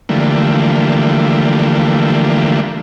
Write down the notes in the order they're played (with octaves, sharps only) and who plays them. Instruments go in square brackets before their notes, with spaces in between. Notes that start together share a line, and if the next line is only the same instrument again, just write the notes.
[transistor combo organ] D3 E3 F3 G3 A3 A#3